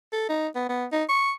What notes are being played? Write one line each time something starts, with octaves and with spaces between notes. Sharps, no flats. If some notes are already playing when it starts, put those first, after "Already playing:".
A4
D#4
B3
B3
D#4
C#6